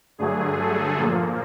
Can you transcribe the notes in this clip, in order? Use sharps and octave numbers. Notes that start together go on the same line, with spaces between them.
G2 D3 F#3 A3 G#4
A4
A#2 F3 A#3